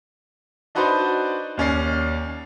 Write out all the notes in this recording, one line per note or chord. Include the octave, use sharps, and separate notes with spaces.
D4 D#4 F#4 B4 C5 D5
D#2 C#4 D5 C7